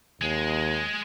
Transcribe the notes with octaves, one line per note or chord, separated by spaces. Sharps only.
D#2 G#3